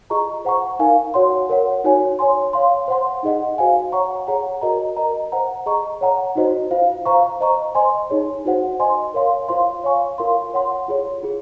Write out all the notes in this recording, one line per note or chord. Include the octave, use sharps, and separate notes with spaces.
F4 G#4 D#5 A#5 C#6
C5 F#5 A#5 C#6
D#4 A#4 F5 G#5
F#4 C#5 F#5 C6
A#4 C#5 F#5
D#4 F#4 C#5 G#5
C#5 G#5 C6
C#5 F5 C6
C5 F#5 C6
D#4 G#4 D#5 F#5
F#4 C5 F5 G#5
C#5 F#5 A#5 C#6
G#4 C#5 F#5 A#5
F#4 A#4 D#5 A#5
A#4 D#5 A#5
C5 F#5 A#5
G#4 D#5 A#5 C#6
C#5 F#5 A#5
D#4 F#4 C5 D#5
F4 C5 F5
C5 F5 A#5 C#6
C5 D#5 A#5 C#6
C5 D#5 G#5 C6
D#4 G#4 C#5
D#4 F#4 C5 F#5
C5 D#5 G#5 C6
A#4 C#5 F5 C6
F4 C5 F5 C6
C#5 F5 G#5 C#6
F4 A#4 F5 C6
C#5 F#5 C6
F4 G#4 C#5
F4 G#4